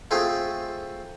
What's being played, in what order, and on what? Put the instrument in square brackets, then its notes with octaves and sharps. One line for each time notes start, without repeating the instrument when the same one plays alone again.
[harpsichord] A3 C4 F4 G#4